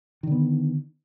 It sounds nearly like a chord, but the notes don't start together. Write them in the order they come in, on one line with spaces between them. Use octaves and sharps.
D#3 D3 B3